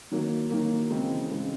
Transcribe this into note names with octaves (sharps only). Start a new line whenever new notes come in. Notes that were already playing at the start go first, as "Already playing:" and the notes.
D#3 F#3 A#3
D#3 F#3 A#3
C#3 E3 G#3 C4
C#3 E3 G#3 C4